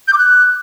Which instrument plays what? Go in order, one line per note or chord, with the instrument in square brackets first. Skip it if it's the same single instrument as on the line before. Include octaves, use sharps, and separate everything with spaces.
[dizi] G6
D6
F#6